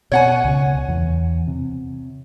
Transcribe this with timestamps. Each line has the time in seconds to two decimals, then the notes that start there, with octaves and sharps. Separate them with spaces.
0.12 B2 C#5 F#5 G#5
0.44 C#2 C#3
0.88 E2 E3
1.48 C3